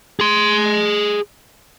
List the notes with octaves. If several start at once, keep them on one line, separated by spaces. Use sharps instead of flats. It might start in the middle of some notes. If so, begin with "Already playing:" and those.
G#4 C6